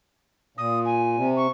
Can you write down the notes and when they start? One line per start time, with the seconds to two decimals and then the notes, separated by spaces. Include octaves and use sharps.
0.57 A#2 D#6
0.85 G#5
1.17 C3
1.36 C#6